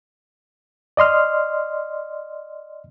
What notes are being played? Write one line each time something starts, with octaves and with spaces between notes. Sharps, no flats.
D5 D#5 C6 F6